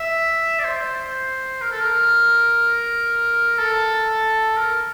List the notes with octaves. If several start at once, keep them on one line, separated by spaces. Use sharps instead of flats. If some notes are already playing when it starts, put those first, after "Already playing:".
Already playing: E5
D5
C5
A#4
A4
A#4
A4
A#4